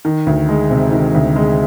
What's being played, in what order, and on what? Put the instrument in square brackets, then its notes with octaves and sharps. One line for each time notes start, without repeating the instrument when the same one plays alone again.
[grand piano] D#3
D2
G#3
C3
D#3
D2
G#3